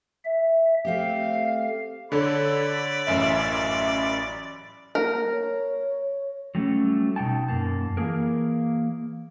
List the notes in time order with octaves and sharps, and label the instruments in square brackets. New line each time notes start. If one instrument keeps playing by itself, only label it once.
[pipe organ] E5
[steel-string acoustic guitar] A3 C4 G4 [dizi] F5
[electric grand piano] D3 A4 C#5 [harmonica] D5 B5
[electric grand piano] A1 F#2 E5
[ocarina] A#3 [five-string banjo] A#4
[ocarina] C#5
[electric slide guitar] F#3 G3 A3 C#4
B2 D#4 G5 A5
F#2 A#3 A5
E3 A#3 G#4 A#4